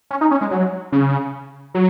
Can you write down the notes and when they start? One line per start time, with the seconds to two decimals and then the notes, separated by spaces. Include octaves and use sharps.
0.11 C#4
0.21 D#4
0.31 C#4
0.41 G#3
0.51 F#3
0.92 C#3
1.74 F#3